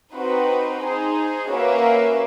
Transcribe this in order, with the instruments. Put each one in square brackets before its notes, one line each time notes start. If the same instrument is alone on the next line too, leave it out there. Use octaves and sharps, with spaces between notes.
[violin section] C4 D#4 F#4 B4
D#4 G#4 C5
A#3 C#4 F#4 B4 E5